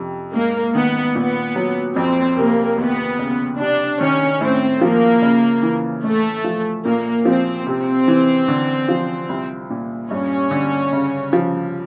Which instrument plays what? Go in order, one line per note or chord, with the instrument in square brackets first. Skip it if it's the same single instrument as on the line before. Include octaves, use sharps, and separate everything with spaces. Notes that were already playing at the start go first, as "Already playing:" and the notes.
Already playing: [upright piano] F2 C3
[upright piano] G#2 [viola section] A#3
[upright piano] D#3 [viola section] B3
[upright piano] A#2 [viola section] B3
[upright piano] F#3
[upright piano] F2 [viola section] C4
[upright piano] C3 [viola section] A#3
[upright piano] D#2 [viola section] B3
[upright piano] C#3
[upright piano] C3 [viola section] D4
[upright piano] D#3 [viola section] C#4
[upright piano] A2 [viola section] C4
[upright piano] F3 [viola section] A#3
[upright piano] C#3
E3
[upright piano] A2 [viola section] A3
[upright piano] F3
[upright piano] A#2 [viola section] A#3
[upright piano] F3 [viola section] C4
[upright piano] C3 [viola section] C4
[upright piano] E3
D3
F3
C2
A#2
[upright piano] G2 [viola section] C#4
[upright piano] D3
C#3
F3